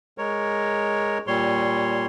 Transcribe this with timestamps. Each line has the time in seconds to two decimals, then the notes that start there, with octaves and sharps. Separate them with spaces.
0.18 G#3 A#4 C#5
1.27 A#2 G3 C#5 C6